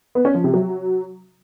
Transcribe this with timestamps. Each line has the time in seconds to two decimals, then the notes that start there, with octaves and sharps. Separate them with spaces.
0.15 B3
0.25 C#4
0.34 F3
0.44 C3
0.54 F#3